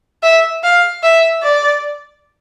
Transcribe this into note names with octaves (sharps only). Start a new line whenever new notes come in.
E5
F5
E5
D5